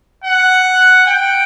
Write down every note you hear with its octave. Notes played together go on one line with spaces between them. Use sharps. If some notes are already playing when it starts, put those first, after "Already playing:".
F#5
G5